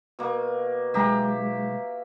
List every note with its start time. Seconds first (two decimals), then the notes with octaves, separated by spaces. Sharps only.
0.19 B2 A#3
0.94 B1 G#3 G4 E5 A#5